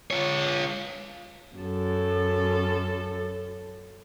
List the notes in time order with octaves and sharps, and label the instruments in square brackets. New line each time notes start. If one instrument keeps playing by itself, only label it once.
[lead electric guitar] F4 C#5
[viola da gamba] F#2 A4